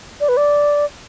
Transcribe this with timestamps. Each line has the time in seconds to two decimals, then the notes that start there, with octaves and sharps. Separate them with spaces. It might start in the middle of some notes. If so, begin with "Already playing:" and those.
0.20 D5
0.29 B4
0.37 D5